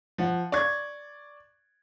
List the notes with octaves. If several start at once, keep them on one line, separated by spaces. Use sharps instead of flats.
F3 F#5
D5 C#6 G#6